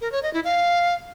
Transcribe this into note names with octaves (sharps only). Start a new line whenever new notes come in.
A#4
C#5
D#5
E4
F5